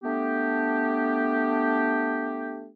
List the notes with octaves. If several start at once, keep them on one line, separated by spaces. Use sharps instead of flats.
A3 B3 D4 G4